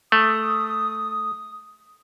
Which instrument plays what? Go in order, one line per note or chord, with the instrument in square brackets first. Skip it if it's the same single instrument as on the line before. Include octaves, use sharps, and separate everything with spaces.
[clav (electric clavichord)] A3 [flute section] D#6